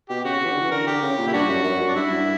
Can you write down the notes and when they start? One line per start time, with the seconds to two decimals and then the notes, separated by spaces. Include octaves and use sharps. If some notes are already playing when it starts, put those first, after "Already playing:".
0.10 B2 G4
0.25 C#3 F#4
0.40 C#3
0.45 E3
0.51 D3
0.61 E3
0.71 D3 A#4
0.87 D3 G4
1.02 C#3
1.18 A#2
1.28 E4
1.33 G2 D4 F#4
1.49 F#2
1.64 F#2
1.80 F#2
1.88 D4
1.96 G2 E4
2.11 G2